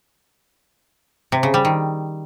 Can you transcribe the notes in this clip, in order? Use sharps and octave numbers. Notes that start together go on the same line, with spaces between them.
C3
C#3
G3
D#3